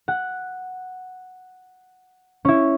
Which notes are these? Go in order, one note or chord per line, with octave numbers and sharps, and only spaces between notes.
F#5
C#4 E4